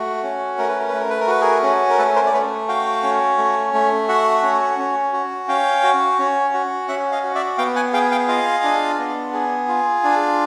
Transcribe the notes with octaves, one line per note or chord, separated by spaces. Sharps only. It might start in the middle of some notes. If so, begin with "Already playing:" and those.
Already playing: A3 F#4
C#4
A3 A#4
B4
A#4
A3 B4
A#4
B4
A#4
F#4 B4
G#4 A#4
C#4
A#4
A3 A4 B4
A#4 C5
D5
A3 B4 C#5
F#4 F5 G5
C#4
A3
A3
F#4 E5 F#5
C#4
C#4
F#4
C#4 F5 G5
F#4
C#4
F#4
C#4 E5 F#5
D#5 F5
F#4
D5 E5
B3 F5 G5
F#5 G#5
G#4 F5 G5
F5 G5
F4 D#5 F5
D4
B3
G#4
F4
D4